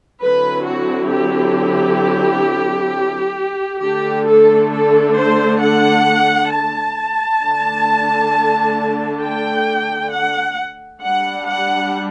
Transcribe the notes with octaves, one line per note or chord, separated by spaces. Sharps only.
D3 F#3 C4 E4 B4
F#4
G4
D3 A3 D4 G4
A4
A4
C5
F#5
A5
D3 A3 D4
G5
F#5
G3 D4 F#5
F#5